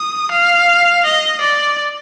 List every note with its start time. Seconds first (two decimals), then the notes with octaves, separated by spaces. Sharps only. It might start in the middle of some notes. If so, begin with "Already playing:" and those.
Already playing: D#6
0.31 F5
1.05 D#5
1.41 D5